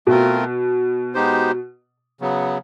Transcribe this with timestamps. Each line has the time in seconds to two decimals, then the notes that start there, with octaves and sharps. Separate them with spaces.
0.07 B2 A3 C4 F4 A#4
1.14 G#3 B3 D#4 G4 C5
2.21 C#3 F#3 B3